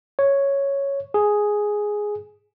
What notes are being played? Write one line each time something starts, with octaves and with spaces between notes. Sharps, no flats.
C#5
G#4